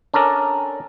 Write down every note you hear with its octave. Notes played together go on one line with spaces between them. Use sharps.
C#4 D4 A4 A#4 D5